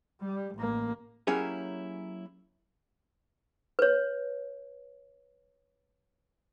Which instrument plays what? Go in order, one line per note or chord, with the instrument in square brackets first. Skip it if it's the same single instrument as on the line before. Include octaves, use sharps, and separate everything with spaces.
[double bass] G3
A1 A#3
[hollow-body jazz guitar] F#3 A#3 C#4 E4 G4 G#4
[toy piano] B4 C#5